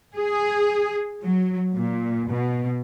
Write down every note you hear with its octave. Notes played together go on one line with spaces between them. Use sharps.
G#4
F#3
A#2
B2